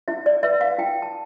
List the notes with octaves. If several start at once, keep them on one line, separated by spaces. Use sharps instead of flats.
E4 E5
D5
B4 E5
F5
E4 G5
A5